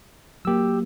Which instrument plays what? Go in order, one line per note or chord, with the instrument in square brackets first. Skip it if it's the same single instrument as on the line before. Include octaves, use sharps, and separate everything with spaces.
[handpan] F#3 A#3 [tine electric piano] G4 E6